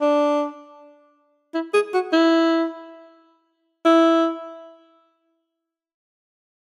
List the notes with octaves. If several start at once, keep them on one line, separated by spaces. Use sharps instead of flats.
D4
E4
G#4
F#4
E4
E4